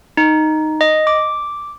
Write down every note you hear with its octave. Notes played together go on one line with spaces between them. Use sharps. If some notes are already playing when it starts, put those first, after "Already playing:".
D#4
D#5
D6